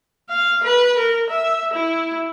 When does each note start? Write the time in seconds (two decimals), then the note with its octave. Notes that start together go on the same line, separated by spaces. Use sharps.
0.30 F5
0.64 B4
0.99 A#4
1.30 E5
1.74 E4